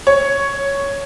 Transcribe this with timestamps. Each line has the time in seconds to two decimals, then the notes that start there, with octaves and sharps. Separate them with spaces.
0.07 C#5